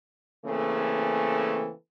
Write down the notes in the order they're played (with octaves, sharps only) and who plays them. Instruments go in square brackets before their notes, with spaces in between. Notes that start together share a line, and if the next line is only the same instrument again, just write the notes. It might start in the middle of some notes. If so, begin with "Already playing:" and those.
[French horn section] C#3 E3 A3 A#3 C4 A4